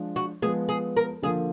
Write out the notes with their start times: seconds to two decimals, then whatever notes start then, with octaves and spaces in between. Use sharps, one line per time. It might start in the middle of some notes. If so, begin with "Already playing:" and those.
Already playing: F3 G#3 D4
0.16 F#4
0.42 F3 G#3 B3 G#4
0.69 G#4
0.97 A#4
1.22 D3 F3 A#3 G#4